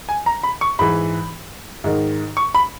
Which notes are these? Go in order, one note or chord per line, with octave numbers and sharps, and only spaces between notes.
G#5
A#5
B5
C#6
G#2 E3 B5
G#2 D#3
C#6
B5